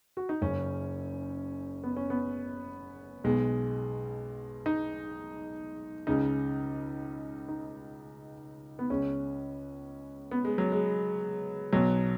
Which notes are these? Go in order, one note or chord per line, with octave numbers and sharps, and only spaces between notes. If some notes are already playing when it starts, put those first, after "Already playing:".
F#4
D#4
F#1 F#2 C#3 C#4
B3
C#4
B3
B1 B2 G#3
D#4
C#2 C#3 D#4
D#4
B3
C#2 C#3 C#4
B3
G#3
F#3
G#3
B1 B2 F#3